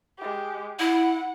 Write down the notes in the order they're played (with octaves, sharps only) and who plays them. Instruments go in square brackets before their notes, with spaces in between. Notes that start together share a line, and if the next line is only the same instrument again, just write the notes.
[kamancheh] G#3 G4
[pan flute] E4 [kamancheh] F#5